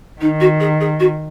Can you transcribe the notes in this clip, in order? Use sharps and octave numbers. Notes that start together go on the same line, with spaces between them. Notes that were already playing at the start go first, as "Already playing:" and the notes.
D#3 D#4
F#4
G#4
G#4
F#4